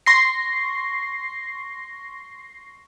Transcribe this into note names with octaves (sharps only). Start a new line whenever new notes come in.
C6 C#6 A#6 C7